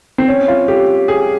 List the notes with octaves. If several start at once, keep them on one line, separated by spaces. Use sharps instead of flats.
C4
C#4
F4
G4
G#4